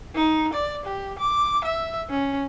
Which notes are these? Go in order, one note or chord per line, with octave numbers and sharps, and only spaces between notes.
D#4
D5
G4
D6
E5
C#4